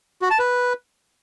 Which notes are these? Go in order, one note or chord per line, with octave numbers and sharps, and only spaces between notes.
F#4
A5
B4